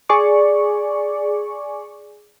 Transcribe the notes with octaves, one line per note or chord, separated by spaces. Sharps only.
G#4 D5 C#6